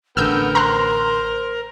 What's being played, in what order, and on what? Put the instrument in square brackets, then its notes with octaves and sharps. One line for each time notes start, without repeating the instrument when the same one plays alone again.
[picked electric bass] A1 D3 [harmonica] B3 G5 [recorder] A#4 [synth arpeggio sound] E6 F6 G6
[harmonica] C5 [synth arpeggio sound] A#5 C6 F#6